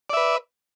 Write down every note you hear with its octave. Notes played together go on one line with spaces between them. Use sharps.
B4 D5 E5